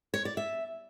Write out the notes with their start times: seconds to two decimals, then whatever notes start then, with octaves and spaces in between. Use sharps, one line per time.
0.14 C#5
0.25 D5
0.37 E5